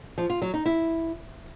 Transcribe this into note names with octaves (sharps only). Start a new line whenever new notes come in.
F3
F4
F#3
D#4
E4